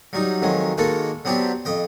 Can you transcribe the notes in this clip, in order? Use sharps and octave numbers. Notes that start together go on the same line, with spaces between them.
F#3 G3 D#4
F2 D#3 F#3 G#3
D#3 G#3 A#3 F#4 A4
F#3 B3 C4 D4 G4
F2 D#5 G5